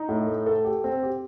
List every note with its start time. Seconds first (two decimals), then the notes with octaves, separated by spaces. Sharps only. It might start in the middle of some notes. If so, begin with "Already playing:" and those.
Already playing: D#4
0.09 A2
0.27 A3
0.46 A4
0.64 G4
0.84 C4
1.03 G4